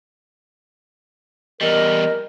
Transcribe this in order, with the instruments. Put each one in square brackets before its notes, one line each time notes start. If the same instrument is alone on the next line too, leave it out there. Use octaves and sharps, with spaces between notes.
[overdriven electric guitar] E2 G3 [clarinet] A#4 [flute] D#5